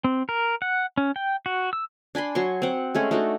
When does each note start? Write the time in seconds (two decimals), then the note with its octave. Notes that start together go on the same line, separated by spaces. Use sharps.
0.04 C4
0.29 A#4
0.62 F#5
0.98 C#4
1.16 G5
1.46 F#4
1.73 E6
2.15 D4 G#5 B5 C6
2.35 F#3 C6 C#6
2.62 C4 F#5
2.95 G#3 A3 C#4
3.11 A3 D4 D#4 F#4